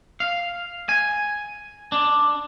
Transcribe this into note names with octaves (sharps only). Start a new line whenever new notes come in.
F5
G#5
D4